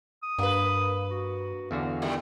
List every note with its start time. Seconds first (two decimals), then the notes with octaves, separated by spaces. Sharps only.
0.23 D#6
0.39 G2 A#3 B4
1.10 F#4
1.71 E2 D3 F#4 F5
2.02 D#3 G3 A3